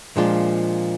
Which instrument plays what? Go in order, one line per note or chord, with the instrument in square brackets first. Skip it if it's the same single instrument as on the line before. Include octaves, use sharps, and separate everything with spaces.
[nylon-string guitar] A#2 F3 G#3 D4 F4